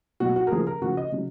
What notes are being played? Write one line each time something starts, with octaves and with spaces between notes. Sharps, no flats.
B2 F#3 F#4
F#4
A#4
C#3 F3 G#4
A#4
C#3 F3 F#4
D#5
C#3 F#3